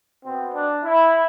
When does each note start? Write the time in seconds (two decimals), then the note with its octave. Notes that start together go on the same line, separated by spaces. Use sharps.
0.23 B2 B3 C4
0.53 D4
0.84 E4